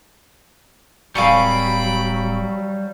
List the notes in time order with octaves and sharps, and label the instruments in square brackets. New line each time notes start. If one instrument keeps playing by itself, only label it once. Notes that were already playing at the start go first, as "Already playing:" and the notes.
[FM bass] D1 [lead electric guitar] F#3 G3 [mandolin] F5 G#5 C#6 [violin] B5 D7